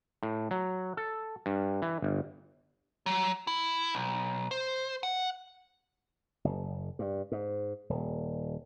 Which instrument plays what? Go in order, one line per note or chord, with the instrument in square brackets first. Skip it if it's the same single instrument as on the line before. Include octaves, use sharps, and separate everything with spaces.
[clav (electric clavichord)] A2
F#3
A4
G2
E3
G1
[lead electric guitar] F#3
E4
B1
C5
F#5
[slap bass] F#1
G2
G#2
D#1